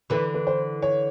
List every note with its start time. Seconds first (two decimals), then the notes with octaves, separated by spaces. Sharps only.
0.10 D3 E3 B4
0.34 B4
0.47 C5
0.82 C#5